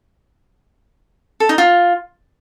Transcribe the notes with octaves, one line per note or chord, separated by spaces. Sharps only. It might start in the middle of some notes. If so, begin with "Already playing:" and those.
A4
D#4
F4